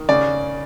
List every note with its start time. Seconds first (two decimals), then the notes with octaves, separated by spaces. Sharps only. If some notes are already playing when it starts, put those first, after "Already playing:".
Already playing: D#3
0.09 C#3 D5